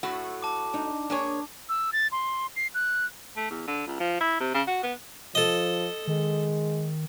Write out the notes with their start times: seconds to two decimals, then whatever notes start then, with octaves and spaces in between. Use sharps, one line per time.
0.03 A2 A3 F#4
0.42 A5 D6
0.74 D4 D#4
1.10 A#3 D4 G#4 C#5
1.69 E6
1.93 A6
2.12 C6
2.56 C7
2.74 F#6
3.36 A3
3.50 E2
3.67 D3
3.87 C#2
4.00 F3
4.21 E4
4.40 C3
4.54 C#3
4.67 F#4
4.83 B3
5.35 F3 A4 D#5
6.07 D#3 G#3